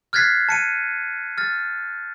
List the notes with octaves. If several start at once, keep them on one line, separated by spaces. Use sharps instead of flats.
F6 F#6 G#6 A6 B6 C7
A5 C#7 D#7
F6 A6